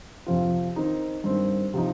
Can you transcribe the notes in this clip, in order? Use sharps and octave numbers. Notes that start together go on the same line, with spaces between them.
F2 C3 F3 C4 F4
D#3 C4 D#4
G2 D#3 C4
C3 F3 D#4